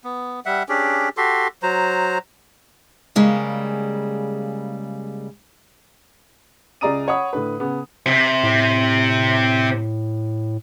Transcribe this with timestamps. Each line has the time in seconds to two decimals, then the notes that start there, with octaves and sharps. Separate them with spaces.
0.04 B3
0.46 G3 E5 F#5
0.69 C#4 D4 G4 G#4
1.17 F#4 G4 A4 C6
1.63 F#3 C5 A#5
3.16 C#3 G3 G#3 A#3
6.81 C#2 G#4 D5 A#5 D#6 D#7
7.08 C#5 F#5 B5 D#6
7.33 A2 D3 B4
7.60 C#3 B3
8.06 C3
8.43 A2